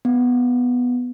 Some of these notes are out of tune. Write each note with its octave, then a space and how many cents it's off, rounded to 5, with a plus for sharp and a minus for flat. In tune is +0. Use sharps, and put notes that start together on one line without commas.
B3 +0